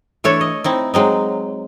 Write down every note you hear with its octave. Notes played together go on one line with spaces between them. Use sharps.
E3 A3 D4 A4 C#5
D#5
C4 D#4 E4
F#3 G#3 C4 D#4